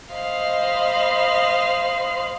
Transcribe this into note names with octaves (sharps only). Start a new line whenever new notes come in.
C5 D#5 F5 B5